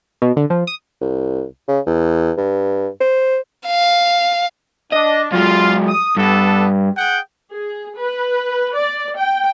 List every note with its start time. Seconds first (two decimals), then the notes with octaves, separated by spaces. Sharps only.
0.22 B2
0.36 D3
0.50 F3
0.67 D#6
1.01 C2
1.68 C#3
1.86 E2
2.37 G2
3.00 C5
3.67 F5
4.92 D4 D#5
5.32 F#3 G#3 F4
5.88 D#6
6.17 G2 B3 D4 A4
6.97 G#4 F#5 G5
7.53 G#4
8.00 B4
8.76 D5
9.19 G5